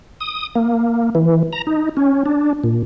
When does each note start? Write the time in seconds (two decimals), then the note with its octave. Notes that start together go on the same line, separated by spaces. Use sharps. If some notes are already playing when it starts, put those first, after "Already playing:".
0.21 D#6
0.55 A#3
1.15 E3
1.53 A#5
1.67 D#4
1.97 C#4
2.26 D4
2.64 A#2